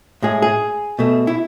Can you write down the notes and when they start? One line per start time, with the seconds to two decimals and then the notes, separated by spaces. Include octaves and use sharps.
0.22 A2 G#3 G#4
0.42 G#4
0.99 B2 A3
1.27 E4